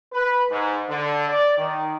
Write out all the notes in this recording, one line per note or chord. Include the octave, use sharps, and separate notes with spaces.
B4
G#2
D3
D5
D#3